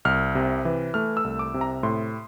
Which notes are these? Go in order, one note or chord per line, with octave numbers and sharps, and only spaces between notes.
C2 F6
C3
E3
A3 F6
E6
C2
D6
C3
A#5
A2 C6